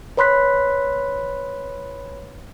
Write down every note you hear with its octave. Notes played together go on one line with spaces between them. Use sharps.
B4 C#5 B5 C6 F#6 B6